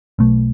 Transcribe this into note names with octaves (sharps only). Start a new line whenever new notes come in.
B1 B2 A3